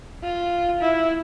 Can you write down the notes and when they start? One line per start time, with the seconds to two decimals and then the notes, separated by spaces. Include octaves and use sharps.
0.23 F4
0.81 E4